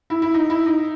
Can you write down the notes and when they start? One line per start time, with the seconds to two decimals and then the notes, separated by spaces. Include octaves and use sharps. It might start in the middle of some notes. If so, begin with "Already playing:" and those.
0.10 E4
0.22 E4
0.34 D#4
0.50 E4
0.66 D#4